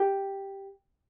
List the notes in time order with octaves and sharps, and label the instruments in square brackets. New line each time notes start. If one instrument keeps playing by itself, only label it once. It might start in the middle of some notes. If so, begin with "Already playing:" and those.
Already playing: [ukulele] G4